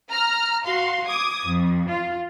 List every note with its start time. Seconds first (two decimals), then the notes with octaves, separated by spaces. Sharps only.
0.10 A#5 F6
0.66 F#4 F5 C6
1.07 D6 D#6 G#6
1.48 F2
1.90 F4